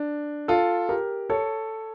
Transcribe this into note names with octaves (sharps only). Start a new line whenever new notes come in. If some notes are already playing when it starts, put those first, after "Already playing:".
Already playing: D4
F4 A4
G4 A#4
A4 C#5